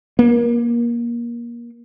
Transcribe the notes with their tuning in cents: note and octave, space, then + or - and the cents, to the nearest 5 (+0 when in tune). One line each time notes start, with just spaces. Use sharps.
A#3 +25